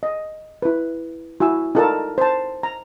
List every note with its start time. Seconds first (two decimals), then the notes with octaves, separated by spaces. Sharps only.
0.03 D#5
0.62 E4 B4
1.40 E4 F#4 G#5 E6
1.75 D#4 F4 A4 A#4 D5 A5
2.18 C5 A5
2.63 A#5